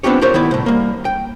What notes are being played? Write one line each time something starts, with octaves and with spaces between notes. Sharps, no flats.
B3 C4 D4 F4 G4 C#5
F4 G4 A#4 C5 C#5
D#3 B3 E4 D5
C2 A2
G3 A#3
G5